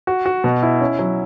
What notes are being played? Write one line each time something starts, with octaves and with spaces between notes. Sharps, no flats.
F#4
F#4
B2
E4
C#4
F#3